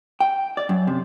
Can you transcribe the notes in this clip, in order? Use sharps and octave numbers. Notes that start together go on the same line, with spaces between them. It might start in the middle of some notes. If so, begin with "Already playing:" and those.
G5
D5
F#2
C3